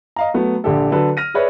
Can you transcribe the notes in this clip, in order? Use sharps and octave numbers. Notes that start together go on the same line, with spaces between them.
D#5 F5 A#5
F#3 A3 B3
A#1 D3 G4 A4
D3 F#3 A4 B4
F6 A#6 D#7
G#4 B4 C#5 D5 E5